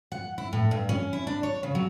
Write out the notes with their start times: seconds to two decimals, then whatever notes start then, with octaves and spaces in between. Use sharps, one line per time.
0.12 F#5
0.38 E4
0.53 A2
0.71 G2
0.89 C#4
1.13 E4
1.27 D4
1.43 C#5
1.63 C#3
1.75 F#3